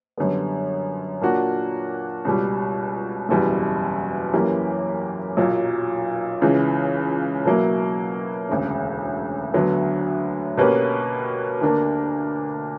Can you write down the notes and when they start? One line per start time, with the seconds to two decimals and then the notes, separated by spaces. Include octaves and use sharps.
0.18 F#2 D3 G3 B3
1.21 A#2 A#3 D4 F#4
2.25 C#2 B2 G3
3.29 F#1 E2 B2 G3
4.33 F#2 E3 A#3 C#4 G4
5.37 B1 A#2 F#3
6.42 C#2 C#3 E3
7.45 B2 F#3 A#3 E4
8.49 E1 D2 C#3
9.54 D2 D3 F#3 B3
10.57 B2 A#3 C#4 G4 B4
11.61 D2 D3 A#3 D4 A#4